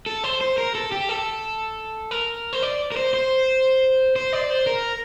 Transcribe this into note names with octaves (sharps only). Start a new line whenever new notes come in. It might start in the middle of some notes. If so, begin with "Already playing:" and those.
A4
C5
C5
A#4
A4
G4
A4
A#4
C5
D5
A#4
C5
C5
C5
D5
C5
A#4